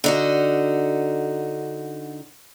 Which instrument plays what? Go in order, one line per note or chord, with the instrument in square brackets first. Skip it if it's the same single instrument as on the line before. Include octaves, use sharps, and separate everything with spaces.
[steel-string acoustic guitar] D3 D#4 F#4